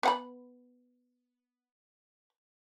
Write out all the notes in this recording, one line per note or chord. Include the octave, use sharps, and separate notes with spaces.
B3 F#5 B5